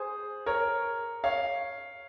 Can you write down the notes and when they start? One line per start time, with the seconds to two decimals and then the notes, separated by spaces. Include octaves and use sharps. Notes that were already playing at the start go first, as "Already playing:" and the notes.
Already playing: G#4 C5
0.46 A#4 C#5
1.24 C#5 F5